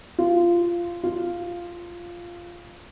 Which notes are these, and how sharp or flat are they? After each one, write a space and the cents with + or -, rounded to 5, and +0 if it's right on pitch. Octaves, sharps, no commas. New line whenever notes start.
F4 -15
F4 -5